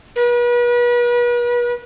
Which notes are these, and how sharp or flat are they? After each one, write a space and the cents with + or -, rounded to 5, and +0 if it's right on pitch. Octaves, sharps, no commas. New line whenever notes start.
B4 -40